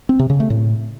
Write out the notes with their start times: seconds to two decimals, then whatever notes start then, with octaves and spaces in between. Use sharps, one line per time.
0.09 C4
0.19 C3
0.30 C#3
0.40 A3
0.50 A2